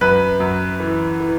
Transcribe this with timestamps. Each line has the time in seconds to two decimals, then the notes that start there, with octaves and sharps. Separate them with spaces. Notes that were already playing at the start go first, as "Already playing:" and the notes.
0.01 F#2 B4
0.40 F#2
0.80 E3
1.20 E3